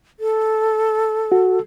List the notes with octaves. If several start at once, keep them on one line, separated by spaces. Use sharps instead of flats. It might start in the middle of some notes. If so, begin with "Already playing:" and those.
A4
F#4